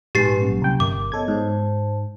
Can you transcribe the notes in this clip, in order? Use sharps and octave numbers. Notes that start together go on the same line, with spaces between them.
A#1 G#2 G4 B4 G#5 C6 A6 C7
F#3 A#3 C#4
C2 G5
G1 A#4 D6
B3 A4 C#5 D#5 G#6
G#2 C5 A5